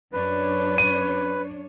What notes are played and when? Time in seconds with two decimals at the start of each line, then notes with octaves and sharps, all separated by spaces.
0.13 F#2 D4 B4 C#5
0.78 D#7